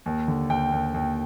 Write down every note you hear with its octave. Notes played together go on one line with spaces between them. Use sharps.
D#2
D3
D#2 G5
D#2
D#2